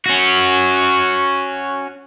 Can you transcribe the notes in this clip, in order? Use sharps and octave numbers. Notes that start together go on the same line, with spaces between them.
C#4 F#4